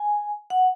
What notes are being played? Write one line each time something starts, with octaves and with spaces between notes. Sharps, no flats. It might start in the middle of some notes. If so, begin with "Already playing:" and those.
Already playing: G#5
F#5